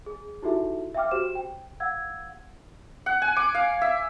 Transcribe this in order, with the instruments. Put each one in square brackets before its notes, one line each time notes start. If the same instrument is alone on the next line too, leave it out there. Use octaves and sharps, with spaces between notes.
[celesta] G#4
D#4 E4 F#4 G4 A4 E5
E5 F5 G5 D6 F6
F#4 G4 C5 E7
G5
F5 F#5 E6 G#6
[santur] F#5
G#5
D6
F5
E5